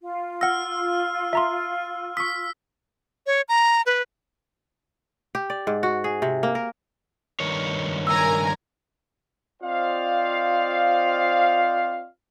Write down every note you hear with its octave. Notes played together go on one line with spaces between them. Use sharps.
F4
F#5 E6 F6 A#6
E5 A#5 C6
C#6 D#6 E6 B6
C#5
A#5
B4
G4
D5
G#2
F#4
G#4
C3
A#3
A#4
G2 D#3 C#5
A#4 G#5 A#5 E6
C4 F4 C5 D5 D#5 F5